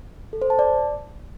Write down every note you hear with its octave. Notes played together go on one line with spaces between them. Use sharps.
A4
C5
A5
D5